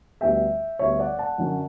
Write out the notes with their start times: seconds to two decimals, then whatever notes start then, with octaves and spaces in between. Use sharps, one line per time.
0.21 D2 D3 G3 B3 E5 G5
0.79 D2 D3 G3 B3 C#5 E5
0.99 D5 F#5
1.19 F#5 A5
1.38 F#2 D3 F#3 C#4